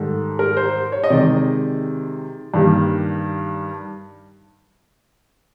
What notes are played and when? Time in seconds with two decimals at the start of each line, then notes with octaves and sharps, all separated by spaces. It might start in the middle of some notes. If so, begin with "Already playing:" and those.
Already playing: G#2 D#3 G3 A4
0.39 A#4
0.57 C5
0.92 C#5
1.04 D#5
1.10 C3 D#3 G#3 D5
2.54 G2 D#3 G3 A#3